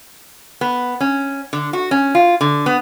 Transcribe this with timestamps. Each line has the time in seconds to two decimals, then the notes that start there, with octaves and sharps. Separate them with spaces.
0.61 B3
1.00 C#4
1.53 D3
1.73 F#4
1.91 C#4
2.15 F4
2.41 D3
2.66 B3